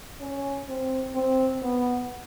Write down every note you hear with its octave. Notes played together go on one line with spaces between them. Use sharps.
C#4
C4
C4
B3